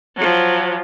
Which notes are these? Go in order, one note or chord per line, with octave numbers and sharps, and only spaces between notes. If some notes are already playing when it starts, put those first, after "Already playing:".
F3 F#3